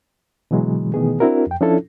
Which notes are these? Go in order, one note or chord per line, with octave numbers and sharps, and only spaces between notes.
B2 D3 E3 F#3 G#3
B2 D#3 E3 A3 B3 G#4
C4 D4 E4 F#4 A#4
F2 G5
F3 C#4 D4 E4 F4 A4